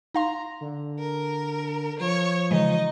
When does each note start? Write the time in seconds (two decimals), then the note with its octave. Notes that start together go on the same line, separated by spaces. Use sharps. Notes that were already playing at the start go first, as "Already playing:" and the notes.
0.15 D#4 F5 A#5 C6
0.61 D3
0.98 A#4
2.00 F3 C#5 D7
2.51 C#3 E3 G#3 D#4 D#5